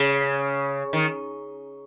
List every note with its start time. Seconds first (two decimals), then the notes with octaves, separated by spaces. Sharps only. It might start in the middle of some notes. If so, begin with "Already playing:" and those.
Already playing: C#3
0.93 D#3